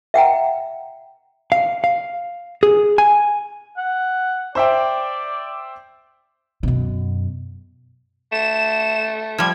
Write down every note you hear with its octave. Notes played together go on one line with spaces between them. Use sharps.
E5 F#5 G5 A#5
F5
F5
G#4
G#5
F#5
C5 D5 E5 G5
F#2 B2
A3 E7
F3 G3 G#6